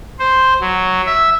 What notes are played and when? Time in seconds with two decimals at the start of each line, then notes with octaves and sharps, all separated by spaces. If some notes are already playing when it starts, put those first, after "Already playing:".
0.19 C5
0.61 F#3
1.06 E5